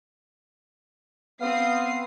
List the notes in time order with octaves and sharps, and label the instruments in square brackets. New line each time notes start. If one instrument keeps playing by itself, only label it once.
[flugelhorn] B3 [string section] C4 D#6 C7 [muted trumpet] F5